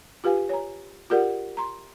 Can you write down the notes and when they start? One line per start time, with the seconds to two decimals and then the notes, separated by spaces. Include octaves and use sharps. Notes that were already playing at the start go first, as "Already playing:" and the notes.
0.24 F4 G4 B4 F5 G#5
0.49 C#5 G#5 A#5
1.10 F4 G4 G#4 A#4 D5 F#5
1.57 A#5 C6